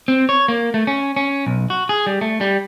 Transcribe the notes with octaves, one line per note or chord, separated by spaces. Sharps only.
C4
C#5
A#3
A3
C#4
C#4
B1
F#4
G#4
G3
A3
G3